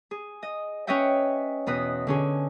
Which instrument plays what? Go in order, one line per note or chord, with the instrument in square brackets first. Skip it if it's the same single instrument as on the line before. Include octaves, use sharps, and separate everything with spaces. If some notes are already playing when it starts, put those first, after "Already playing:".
[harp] G#4
D#5
C#4 B4 C#5 D#5 E5 G5
E2 B2 B4 D#6
D3 C#4 G#4